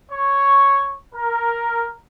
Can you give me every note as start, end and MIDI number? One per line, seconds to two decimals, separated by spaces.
0.11 0.93 73
0.11 0.93 85
1.14 1.92 70